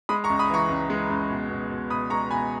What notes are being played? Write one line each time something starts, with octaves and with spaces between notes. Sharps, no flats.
G#3 B5 D#6
A#5 C#6
C#2
B5 D#6
E3 A#5 C#6
C#2
G#3
C#2
B2
B2
B2
B2 B5 D#6
G#3 A#5 C#6
B2 G#5 B5